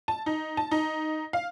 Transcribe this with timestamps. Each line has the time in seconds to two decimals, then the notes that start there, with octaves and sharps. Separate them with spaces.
0.08 A5
0.26 D#4
0.57 A5
0.71 D#4
1.33 F5